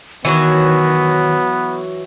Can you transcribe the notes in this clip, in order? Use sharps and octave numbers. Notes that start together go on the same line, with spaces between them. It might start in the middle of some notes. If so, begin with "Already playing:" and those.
D#3 E3 F#3 B3 F#4